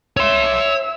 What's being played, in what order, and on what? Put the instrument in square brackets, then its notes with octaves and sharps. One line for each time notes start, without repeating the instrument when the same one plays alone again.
[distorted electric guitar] C#5 C6 [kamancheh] E5 E6